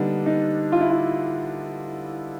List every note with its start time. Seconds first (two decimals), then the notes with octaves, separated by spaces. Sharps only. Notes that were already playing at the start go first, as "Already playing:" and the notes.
Already playing: D3 G3 B3 D4 D#4
0.26 D#4
0.72 F4
0.81 E4
0.90 F4